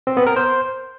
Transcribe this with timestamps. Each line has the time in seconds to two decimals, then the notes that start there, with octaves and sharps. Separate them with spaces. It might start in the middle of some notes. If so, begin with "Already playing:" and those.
0.07 C4
0.17 B3
0.27 A#4
0.36 C5